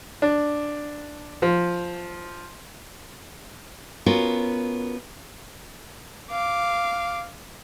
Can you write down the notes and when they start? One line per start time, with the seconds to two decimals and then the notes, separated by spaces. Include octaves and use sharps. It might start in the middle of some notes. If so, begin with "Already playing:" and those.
0.22 D4
1.42 F3
4.06 B3 C#4 F4 F#4 A#4
6.31 F5 D6